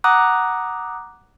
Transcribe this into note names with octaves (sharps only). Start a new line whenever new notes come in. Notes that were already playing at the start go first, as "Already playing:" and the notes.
F#5 A#5 D6 D#6 F#6